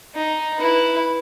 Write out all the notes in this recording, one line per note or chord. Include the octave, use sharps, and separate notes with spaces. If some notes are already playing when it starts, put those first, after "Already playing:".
D#4
E4 B4